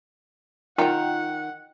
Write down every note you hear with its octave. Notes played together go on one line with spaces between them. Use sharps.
D#3 F4 D#5 F#5 G5 A#5